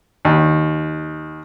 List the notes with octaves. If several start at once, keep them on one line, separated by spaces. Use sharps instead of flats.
D#2